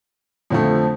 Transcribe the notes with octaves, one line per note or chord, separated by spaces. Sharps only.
F2 D3 F3 A3